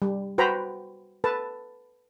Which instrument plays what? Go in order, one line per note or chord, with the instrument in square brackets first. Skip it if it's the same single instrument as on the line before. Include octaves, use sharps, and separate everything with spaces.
[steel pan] G3
F#4 B4 C5 G5 A#5 B5
A4 B4 A5